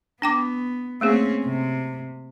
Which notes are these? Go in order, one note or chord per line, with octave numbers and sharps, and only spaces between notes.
B3 D4 G5 D6
A3 A#3 C4 C#4 G#4
C3